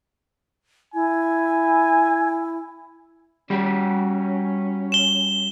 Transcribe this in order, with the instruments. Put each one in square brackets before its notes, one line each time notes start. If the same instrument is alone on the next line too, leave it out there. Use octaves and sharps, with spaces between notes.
[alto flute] E4 [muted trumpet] G#5
[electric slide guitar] G3 F#4 G4 [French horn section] C#4
[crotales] E7 G7